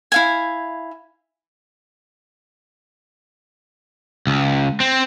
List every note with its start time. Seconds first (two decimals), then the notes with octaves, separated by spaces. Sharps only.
0.12 E4 F5 G#5
4.27 C#2
4.80 C4